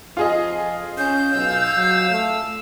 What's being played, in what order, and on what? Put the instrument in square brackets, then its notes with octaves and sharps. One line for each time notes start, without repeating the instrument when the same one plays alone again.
[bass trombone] F2 [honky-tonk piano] F4 G#4 D#5
[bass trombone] C#4 [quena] G6
[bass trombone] B1 [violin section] F5 E6
[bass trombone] F#3
A3